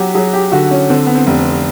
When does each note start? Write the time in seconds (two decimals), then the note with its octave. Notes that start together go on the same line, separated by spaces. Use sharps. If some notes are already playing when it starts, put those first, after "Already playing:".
Already playing: F#3 F#4 G4
0.14 F#3 G#4
0.33 G4
0.52 D3 F#4
0.71 C#4
0.89 D3 C4
1.06 B3
1.15 C4
1.27 F1